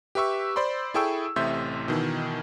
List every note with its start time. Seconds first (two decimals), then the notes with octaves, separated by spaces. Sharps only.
0.15 G4 B4 E5 C#6 E6
0.56 C5 D5 B5 C6
0.94 E4 G#4 A4 G5 C#6 E6
1.36 A1 A2 C3 E5 C6 G6
1.88 B2 D#3 E3